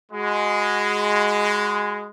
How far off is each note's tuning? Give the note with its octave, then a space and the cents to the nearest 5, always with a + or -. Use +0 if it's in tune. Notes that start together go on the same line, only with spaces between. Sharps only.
G#3 +0 F#4 +0 B5 +40